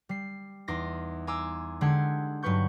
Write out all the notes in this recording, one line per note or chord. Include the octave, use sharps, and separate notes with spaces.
G3 C7
E2 D#4 C6 D6 A#6
G#5 A#5 C6 D6 E6
D3 G#3 G4 F#5 C6 G#6
G2 F#3 D#4 B4 C#6 G6